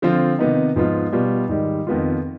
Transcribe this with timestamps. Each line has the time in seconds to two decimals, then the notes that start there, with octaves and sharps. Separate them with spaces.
0.02 D3 F3 C4 F4
0.39 C3 D#3 B3 D#4
0.76 G#2 F3 B3 F4
1.12 B2 G3 B3 F4
1.49 G#2 D#3 G3
1.87 F2 D#3 B3 F4